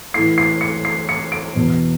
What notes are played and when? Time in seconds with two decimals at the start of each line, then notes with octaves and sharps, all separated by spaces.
0.14 A2 E3 C7
0.38 C7
0.61 C#7
0.85 C7
1.09 C#7
1.32 D7
1.56 E2 B2